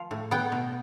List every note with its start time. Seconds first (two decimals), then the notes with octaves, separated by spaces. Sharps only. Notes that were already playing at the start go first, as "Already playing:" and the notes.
Already playing: F3 F5
0.11 A2
0.31 B3 G5
0.52 B2